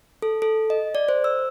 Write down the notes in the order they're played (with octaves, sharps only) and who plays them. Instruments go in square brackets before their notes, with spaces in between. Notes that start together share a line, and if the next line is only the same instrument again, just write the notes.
[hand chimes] A4
A4
D#5
D5
C5
E6